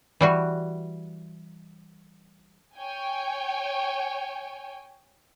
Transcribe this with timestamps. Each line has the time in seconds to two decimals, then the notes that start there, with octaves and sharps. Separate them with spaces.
0.21 E3 G3 F#4
2.76 C#5 G5 G#5